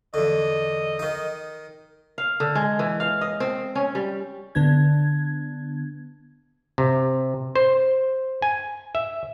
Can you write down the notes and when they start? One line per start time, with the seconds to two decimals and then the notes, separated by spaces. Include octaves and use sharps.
0.14 E2 D3 D#5
0.99 D#3 D#4
2.18 F5
2.40 D3
2.55 G#3
2.79 E3
3.00 F5
3.21 D#5
3.40 C4
3.75 C#4
3.95 G3
4.55 D3 B3 D4 G#6
6.78 C3
7.55 C5
8.42 G#5
8.95 E5